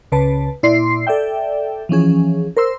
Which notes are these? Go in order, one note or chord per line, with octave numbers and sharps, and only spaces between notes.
C#2 C#3 B4 A5
A#2 E4 D5 C6 C7
A4 D5 E5 G5
E3 F3 C#4 G#4
A#4 C5 C6 E6